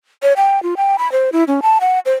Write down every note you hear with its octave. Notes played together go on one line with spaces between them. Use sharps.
C#5
G5
F4
G5
B5
C5
E4
C#4
A5
F#5
C5